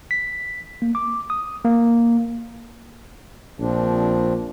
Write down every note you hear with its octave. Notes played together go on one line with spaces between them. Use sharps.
B6
A#3
D6
D#6
A#3
A#1 F3 C4 D4